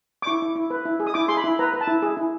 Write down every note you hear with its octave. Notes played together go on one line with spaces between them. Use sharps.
D6
E4 C#6
E4
E4
B4
E4
G#4
D#6
E4 D6
G#4 C6
B5
E4
B4 A#5
B4
A5
E4
G#4
E4